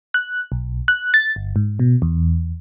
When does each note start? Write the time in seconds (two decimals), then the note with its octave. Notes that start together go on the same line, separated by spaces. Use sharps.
0.14 F#6
0.52 B1
0.88 F#6
1.14 A6
1.36 G1
1.56 G#2
1.79 B2
2.02 E2